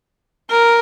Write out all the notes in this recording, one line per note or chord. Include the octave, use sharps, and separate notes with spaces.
A#4